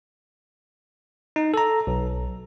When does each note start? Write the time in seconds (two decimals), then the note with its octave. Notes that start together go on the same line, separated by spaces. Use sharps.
1.36 D#4
1.54 A4 A#5
1.87 B1